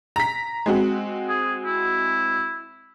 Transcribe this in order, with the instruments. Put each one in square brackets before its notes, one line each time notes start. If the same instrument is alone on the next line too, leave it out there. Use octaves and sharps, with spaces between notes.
[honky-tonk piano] A#5 B6
G#3 C4 F#4
[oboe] G#4
E4